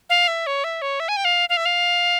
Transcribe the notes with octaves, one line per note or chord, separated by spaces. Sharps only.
F5
E5
C#5
E5
C#5
E5
G#5
G5
F5
F5
E5
F5